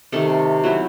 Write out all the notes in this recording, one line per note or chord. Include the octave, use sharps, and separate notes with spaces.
C3 D#3 A3 A4
F#3 C4 E4